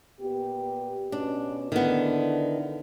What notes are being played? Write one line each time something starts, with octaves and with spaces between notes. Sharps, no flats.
A#2 B3 G4
B2 C#4 D4
D3 D#3 B3 E4